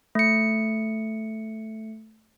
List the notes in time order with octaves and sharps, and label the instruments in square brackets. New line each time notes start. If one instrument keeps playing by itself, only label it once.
[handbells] A3 C#7